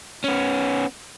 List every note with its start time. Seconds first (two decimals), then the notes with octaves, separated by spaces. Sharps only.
0.24 B3 C#4